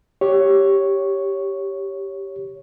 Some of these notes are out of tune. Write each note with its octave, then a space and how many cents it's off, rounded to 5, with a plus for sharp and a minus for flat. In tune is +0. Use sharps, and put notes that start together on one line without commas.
G4 +0 C#5 +0